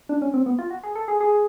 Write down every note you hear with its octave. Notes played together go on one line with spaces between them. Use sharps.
D4
C#4
C4
B3
F4
F#4
G#4
A4
G#4
G#4